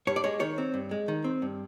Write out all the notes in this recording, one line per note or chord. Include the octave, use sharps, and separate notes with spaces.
G2 C#5
D5
G#3 C#5
D#3 C#5
C4
G2
G#3
D#3
C4
G2